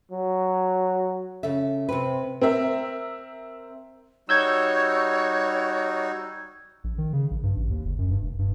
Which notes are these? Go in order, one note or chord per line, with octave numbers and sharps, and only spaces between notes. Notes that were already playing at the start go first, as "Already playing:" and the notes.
F#3
C#3 A4 E5
C3 C4 B4
C4 A#4 E5
G3 D#4 F#4 C#5 E6 G6 G#6
A#1
D#3
C#3
A#1
G2
A1
D#2
F#1
F#2
G2
F1
G2